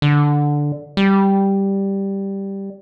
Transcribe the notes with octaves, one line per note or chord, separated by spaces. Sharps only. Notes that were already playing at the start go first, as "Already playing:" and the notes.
D3
G3